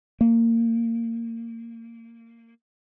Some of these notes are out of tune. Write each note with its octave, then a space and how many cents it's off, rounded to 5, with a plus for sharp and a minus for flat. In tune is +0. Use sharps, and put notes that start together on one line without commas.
A#3 -20